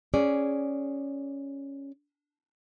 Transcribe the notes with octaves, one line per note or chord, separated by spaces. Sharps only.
C#4 G#4 D5